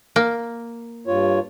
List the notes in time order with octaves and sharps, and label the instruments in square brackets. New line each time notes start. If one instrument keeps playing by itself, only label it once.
[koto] A#3
[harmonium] G2 F4 C#5